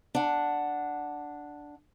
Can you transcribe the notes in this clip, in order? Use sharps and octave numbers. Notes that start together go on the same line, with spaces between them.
D4 F#5